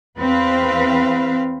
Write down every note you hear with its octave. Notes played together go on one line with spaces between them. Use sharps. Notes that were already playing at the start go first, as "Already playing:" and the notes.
E2 C4 B4 F5